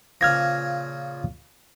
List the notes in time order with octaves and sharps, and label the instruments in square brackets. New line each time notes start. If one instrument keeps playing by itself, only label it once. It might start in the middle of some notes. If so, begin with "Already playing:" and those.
[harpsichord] A#2 C#3 F3 [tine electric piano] F6 G#6 A#6